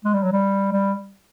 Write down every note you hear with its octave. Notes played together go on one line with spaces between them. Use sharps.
G#3
G3
F#3
G3
G3